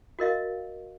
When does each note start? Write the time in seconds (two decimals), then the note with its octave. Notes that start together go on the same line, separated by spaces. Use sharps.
0.19 F#4 A#4 D#5 F5